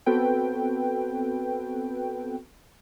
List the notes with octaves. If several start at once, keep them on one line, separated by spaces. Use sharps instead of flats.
B3 C4 F#4 A4 B4 G5